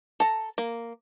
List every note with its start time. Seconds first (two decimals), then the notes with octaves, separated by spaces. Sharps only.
0.20 A4 A#5
0.58 A#3